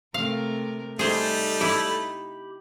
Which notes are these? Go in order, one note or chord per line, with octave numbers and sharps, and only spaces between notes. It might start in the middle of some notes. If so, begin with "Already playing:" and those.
C3 A3 A#4 F5
G3 A3 D#4 G#4 C5
E4 G4 B5